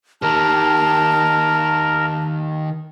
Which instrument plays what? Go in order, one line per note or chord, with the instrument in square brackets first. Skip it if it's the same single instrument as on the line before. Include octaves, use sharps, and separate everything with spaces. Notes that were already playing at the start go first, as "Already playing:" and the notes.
[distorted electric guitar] D#3 G4 [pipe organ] A#4 [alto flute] A5